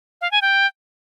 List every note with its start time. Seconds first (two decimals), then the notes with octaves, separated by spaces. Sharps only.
0.21 F5
0.31 G#5
0.42 G5